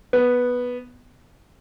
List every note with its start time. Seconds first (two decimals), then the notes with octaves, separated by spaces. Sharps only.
0.13 B3